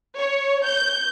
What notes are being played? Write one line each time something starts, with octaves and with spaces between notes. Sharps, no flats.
C#5
G6